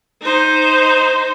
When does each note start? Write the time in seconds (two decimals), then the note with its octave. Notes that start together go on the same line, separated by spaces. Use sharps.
0.21 D#4 C5